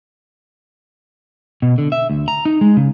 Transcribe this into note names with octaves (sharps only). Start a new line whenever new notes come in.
B2
D3
E5
D2
A#5
D#4
G#3
C#3